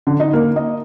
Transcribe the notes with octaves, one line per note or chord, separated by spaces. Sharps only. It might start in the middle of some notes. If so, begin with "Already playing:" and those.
D3
D#4
A#3
D#5